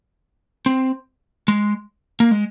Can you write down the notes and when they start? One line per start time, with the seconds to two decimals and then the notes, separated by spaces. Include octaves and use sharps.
0.66 C4
1.48 G#3
2.20 A#3
2.31 G#3